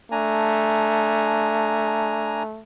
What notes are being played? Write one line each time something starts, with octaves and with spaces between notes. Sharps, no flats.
A3 D4 G#5 A#5